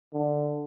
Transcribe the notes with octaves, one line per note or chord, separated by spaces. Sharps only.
D3